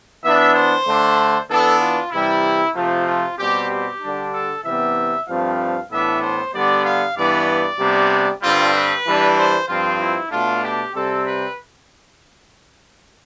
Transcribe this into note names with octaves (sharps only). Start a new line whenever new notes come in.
E3 B3 D4 E5
C5
D3 A3 D4
E3 B3 D4 A4
F4
C3 E3 G3 E4
C3 F3 A3 C4 F4
F4
B2 G3 C4 G4
G4
D3 G3 D4
A4
C3 E3 G3 B3 E5
G2 F3 A3 C4 F5
A2 E3 B3 D4 E5
C5
D3 G3 B3 D5
F5
G2 E3 B3 D5
D5
C3 G3 B3 D4
G2 D3 G3 C4 F4
B4
E3 G3 D4
C5
G2 F3 C4 F4
E4
B2 A3 D4 F4
G4
C3 G3 C4 A4
B4